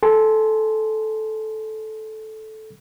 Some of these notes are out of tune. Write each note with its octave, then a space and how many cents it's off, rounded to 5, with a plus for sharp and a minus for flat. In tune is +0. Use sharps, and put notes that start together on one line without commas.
A4 -10 G#5 +5 C6 +0